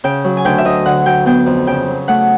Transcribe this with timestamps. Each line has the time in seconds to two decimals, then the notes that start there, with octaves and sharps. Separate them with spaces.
0.04 C#3 G5
0.24 F#3
0.37 G#5
0.45 D2 G5
0.58 E5
0.65 D2 D#5
0.85 D3 F#5
1.05 F#3 G5
1.26 B3 G5
1.46 F2
1.67 C#3 G5
1.88 F#3
2.08 A3 F#5